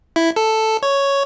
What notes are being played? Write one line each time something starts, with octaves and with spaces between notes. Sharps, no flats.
E4
A4
C#5